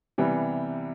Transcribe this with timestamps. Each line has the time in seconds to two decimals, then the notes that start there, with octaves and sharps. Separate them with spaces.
0.18 C3 E3 G3 B3